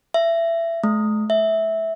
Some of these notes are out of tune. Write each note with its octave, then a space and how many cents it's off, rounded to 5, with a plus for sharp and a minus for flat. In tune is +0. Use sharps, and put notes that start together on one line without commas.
E5 +20
A3 -45
E5 -10